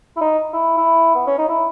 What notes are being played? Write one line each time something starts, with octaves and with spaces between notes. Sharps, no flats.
E4
D#4
E4
E4
B3
C#4
D#4
E4